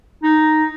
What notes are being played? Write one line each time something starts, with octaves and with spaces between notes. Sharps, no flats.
D#4